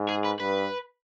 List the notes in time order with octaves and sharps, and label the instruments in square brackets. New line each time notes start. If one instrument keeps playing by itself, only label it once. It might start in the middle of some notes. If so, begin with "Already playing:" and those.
Already playing: [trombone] G#2
[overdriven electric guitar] G#4
B4
[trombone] G2 [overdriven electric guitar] B4